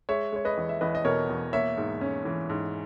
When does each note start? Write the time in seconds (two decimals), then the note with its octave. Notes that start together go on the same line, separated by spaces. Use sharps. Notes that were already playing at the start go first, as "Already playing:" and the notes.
0.09 G#3 C#5 E5
0.32 G#3 C#5
0.45 B4 D#5
0.57 E2
0.69 E5
0.81 E2 B4 D#5
0.95 D#5
1.05 B2 A#4 C#5
1.29 E2
1.53 A#3 C#5 E5
1.77 G#2
2.01 C#4
2.25 E3
2.50 G#2